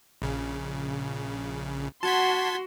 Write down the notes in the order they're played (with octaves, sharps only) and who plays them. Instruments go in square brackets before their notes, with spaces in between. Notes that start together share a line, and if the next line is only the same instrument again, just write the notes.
[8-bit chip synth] A#1 C#3
[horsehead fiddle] F#4 [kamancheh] F#5 C6 [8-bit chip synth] A5 G#6 B6